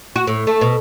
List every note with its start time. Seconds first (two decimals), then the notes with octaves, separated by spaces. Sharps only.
0.16 F#4
0.27 A2
0.47 A3
0.61 B2